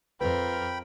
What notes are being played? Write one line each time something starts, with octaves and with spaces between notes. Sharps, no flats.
F2 F4 A#4 B4 G5 B5